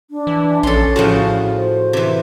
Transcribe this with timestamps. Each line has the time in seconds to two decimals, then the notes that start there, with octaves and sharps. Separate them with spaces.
0.11 D4
0.27 E3
0.63 A#1 C#4 A4 C6
0.96 A2 C#3 F3 F#4
1.55 C5
1.93 C3 E3